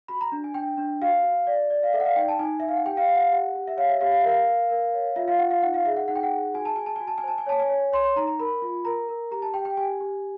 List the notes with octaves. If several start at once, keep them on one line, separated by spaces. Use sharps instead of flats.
F#4 B5
A#5
D4
G#5
D4 G5
D4
F#4 F5
F#4
D5
D5
F5
A4 E5
F#5
F5
D#4 G5
A5
D#4 G#5
D#4 E5
F5
F#5
G4 G5
F5
G4 F5
F#5
F5
G4 F#5
G4
E5
C#5 F5
E5
G4 F5
F5
E5
A#4 F5
A#4
A#4
C#5
F4 E5
F5
F4 F#5
F5
D#4 F#5
F5
G#4 E5
F#5
D#4 F#5
G5
F#5
G#4
F#4 G#5
A5
F#4 G#5
A5
F#4 G#5
A5
G#5
C5 A5
G#5
C#5 A5
G#5
C#5
C#5 C6
C6
D#4 A#5
A#5
A#4 B5
F4
A#4 A#5
A#4
G4 A#5
A5
G4 G5
G5
G4 G#5
G4